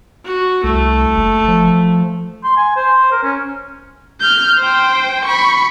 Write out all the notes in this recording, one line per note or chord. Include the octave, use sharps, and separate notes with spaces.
F#4
C2 A3
F#1
F3
C6
G#5
C5
A#4
C#4
F6 G6
C5 G5
B5 C#6